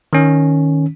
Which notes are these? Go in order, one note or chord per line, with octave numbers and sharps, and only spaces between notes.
D#3 C#4